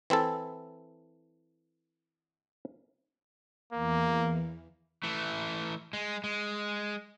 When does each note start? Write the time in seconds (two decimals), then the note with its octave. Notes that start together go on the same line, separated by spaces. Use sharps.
0.10 E3 C4 E4 A4
3.73 E2 E3 A#3
5.03 E3 A3
5.93 G#3
6.24 G#3